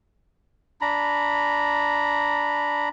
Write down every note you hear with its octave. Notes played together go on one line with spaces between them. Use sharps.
D4 A#5 B5